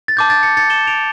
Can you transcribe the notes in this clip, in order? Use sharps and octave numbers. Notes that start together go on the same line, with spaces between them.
A6
A5 D6 G6
A6
A6 C#7
A6 C#7
E7 G7
D7 F7